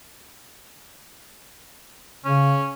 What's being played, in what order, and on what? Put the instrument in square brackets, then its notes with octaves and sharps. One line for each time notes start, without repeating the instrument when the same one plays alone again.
[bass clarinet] C#3 [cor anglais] C#4